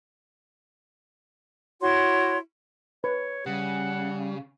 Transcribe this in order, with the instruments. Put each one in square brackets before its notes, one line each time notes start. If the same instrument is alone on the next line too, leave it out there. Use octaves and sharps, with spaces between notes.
[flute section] E4 F#4 C#5 C6
[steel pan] B4 [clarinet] C#5
[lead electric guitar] C#3 [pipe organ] G3 [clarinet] F#5